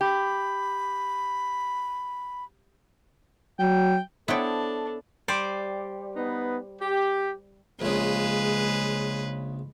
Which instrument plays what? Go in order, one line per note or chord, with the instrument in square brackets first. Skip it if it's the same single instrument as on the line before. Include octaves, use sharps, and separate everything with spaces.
[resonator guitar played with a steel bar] G4 [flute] B5
[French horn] F#3 [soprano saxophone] G5
[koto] B3 G5 [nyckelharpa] D4 [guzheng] E4 C5 C#5 [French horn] A4
[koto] G3 C5 D5
[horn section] B3 D#4 B4
G4
[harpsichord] A#1 C#3 [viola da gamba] G#3 B4